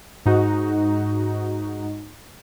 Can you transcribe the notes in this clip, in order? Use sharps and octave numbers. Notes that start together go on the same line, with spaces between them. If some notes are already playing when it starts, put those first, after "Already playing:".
G#2 D#4 F#4